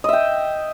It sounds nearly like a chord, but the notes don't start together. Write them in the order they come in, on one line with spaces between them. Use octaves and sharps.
D#5 E5 G5